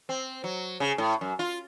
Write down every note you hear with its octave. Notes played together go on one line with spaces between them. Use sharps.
C4
F#3
C#3
A2
F#2
F4